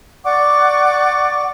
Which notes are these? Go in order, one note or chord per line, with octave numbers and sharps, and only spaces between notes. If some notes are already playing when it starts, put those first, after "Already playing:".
D5 F#5 C#6 D6